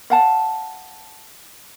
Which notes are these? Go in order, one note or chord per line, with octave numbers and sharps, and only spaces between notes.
F5 F#5 A5